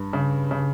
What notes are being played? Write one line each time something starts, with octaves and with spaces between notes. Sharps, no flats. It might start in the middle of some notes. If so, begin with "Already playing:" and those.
Already playing: G2
C#3
C#3